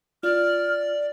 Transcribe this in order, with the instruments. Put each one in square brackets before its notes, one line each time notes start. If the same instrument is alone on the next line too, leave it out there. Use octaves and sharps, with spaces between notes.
[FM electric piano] F4 [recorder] D5 [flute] F6